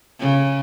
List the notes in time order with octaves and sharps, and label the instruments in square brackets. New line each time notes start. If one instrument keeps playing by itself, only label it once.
[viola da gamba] C#3